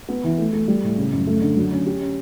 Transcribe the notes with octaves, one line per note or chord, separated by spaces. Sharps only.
B3
E3
A3
A3
G3
A2
C#3
F#2
A3
D3
F#3
C#4
G4
C#4